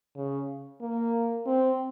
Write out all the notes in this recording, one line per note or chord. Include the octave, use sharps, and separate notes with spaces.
C#3
A#3
C4